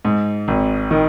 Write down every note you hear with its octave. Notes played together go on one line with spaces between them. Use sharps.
G#2
G#1
D#3